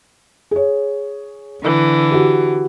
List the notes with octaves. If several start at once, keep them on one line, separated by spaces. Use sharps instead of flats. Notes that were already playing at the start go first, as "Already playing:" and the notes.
G#4 C#5
D3 E3
F#4 G4